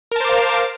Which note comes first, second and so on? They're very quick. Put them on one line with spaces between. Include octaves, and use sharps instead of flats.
A#4 A5 C5 D6 F5